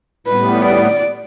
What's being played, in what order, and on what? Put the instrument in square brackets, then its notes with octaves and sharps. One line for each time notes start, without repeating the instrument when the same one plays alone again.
[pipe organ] A2 G3 B3 [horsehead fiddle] B4
[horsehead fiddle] D5